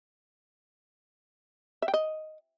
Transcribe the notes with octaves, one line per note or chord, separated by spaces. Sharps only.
E5
G5
D#5